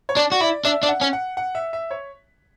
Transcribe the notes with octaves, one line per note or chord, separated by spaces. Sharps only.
C#5
D4 D5
F#4
E4 D5
D4 E5
D4
F#5
C#4
F#5
F#5
E5
E5
C#5